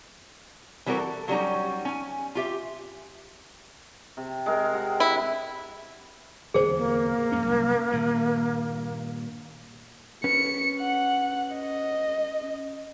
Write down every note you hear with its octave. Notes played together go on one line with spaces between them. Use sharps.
E3 G3 C4 F#4 A#4
A4
F#3 G3 C#4 D#4
C#4 G#5
F4 G4 E5
C3
G#3 A#4
C3 F#5
E4
D1 E2 C#3 G#4 C5
A#3
F2 G#2 C#4
C2 F#2
G2 A#2 D#3
C#4 B4 C#7
F#5
D#5